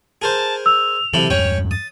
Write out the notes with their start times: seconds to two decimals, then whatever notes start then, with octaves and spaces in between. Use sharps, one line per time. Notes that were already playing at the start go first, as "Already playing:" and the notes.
0.22 G#4 A#4 C5 A5
0.66 E6 F7
1.14 C3 E3 F#3 E4 A4 F#7
1.30 E2 G2 C#4 C#5 G5
1.71 D#6 A6